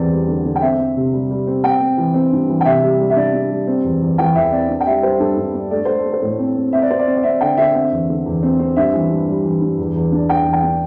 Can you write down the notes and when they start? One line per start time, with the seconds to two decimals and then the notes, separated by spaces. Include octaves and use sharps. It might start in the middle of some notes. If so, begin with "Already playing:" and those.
Already playing: E2 G3 C4 D5
0.11 G3
0.28 D3
0.45 D3
0.56 G5
0.62 C4 E5
0.79 C4
0.96 C3
1.13 G3
1.30 G3
1.47 C4
1.63 C4 G5
1.81 C4
1.98 E3
2.14 C4
2.32 G2
2.49 E3
2.61 G5
2.65 C3 E5
2.82 G3
2.99 G3
3.10 E5
3.16 D4 D5
3.33 D4
3.50 G3
3.67 C4
3.84 E2
4.02 E2
4.18 E3 G5
4.35 E2 E5
4.52 C4 D5
4.69 D4
4.81 G5
4.86 G3 E5
5.03 G3 C5
5.20 G2 A4
5.37 G2
5.54 D4
5.71 A3 D5
5.85 A3 C5
5.99 A4
6.05 A3
6.13 C5
6.22 A2
6.39 C4
6.56 C4
6.73 C4 E5
6.82 D5
6.90 C4 C5
6.99 D5
7.07 C4
7.17 D5
7.23 C4 E5
7.41 D3 G5
7.57 D3 E5
7.74 C4 E5
7.91 E2
8.09 D3
8.26 E2
8.43 C4
8.59 C4
8.76 G2 E5
8.94 E3
9.10 G2
9.28 G3
9.45 E3
9.62 G2
9.79 E2
9.96 E2
10.12 D4
10.29 D4 G5
10.47 E2
10.53 G5
10.63 D4